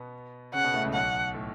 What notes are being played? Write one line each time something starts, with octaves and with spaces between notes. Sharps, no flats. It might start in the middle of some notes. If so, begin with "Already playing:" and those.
Already playing: B2 B3
C#3 C#4 F#5
B2 B3
A2 A3
C#2 C#3
B1 B2 F#5
A2